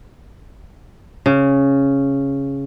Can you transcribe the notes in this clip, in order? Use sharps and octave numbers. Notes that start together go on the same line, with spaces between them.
C#3